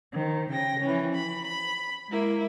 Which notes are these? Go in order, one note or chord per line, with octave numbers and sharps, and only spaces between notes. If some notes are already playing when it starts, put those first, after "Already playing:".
D#3 C5
C#3 G5 A#6
E3 F3 C#4
B5
B5
G#3 A#3 E4